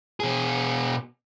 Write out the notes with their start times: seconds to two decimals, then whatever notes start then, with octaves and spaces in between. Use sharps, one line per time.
0.20 B2 G#4